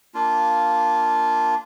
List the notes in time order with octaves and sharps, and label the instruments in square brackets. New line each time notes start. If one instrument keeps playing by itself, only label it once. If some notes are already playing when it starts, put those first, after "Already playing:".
[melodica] A#3 D4 F4